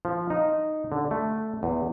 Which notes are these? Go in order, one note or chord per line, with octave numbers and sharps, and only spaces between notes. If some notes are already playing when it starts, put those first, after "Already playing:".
F3
D#4
D3
A3
E2